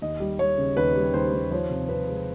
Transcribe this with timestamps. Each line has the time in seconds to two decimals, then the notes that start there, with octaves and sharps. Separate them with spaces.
0.02 D#2 D#5
0.20 G3
0.39 G3 C#5
0.58 C#3
0.76 D#2 B4
0.96 G3
1.13 D#2 C5
1.33 D#2
1.51 F3 C#5
1.70 C3
1.89 C3 B4
2.08 G#3